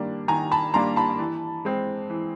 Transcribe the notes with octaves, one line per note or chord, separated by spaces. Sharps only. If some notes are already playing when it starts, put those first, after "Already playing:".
Already playing: D#3 G3 A#3 D4
D#3 G#5 A#5
A5 B5
G3 A#3 D4 A#5 C6
A5 B5
E3
G#3 C4
E3